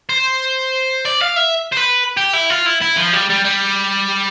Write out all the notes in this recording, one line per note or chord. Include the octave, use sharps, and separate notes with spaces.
C5
D5
F5
E5
C5
B4
G4
E4
F4
E4
E4
F3
G3
G3
G3